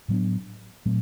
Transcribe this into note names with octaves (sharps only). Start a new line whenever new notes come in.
A2 F#3 B3 D4
A#2 F#3 A3 C4